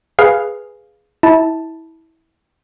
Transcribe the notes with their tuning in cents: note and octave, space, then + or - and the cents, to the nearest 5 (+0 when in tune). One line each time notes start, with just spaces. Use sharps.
G#4 +0 B4 +0 F5 +0
E4 -25 A5 +0